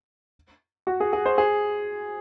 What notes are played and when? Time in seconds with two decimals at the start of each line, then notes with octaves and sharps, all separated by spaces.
0.87 F#4
1.00 G#4
1.13 G#4
1.26 C5
1.38 G#4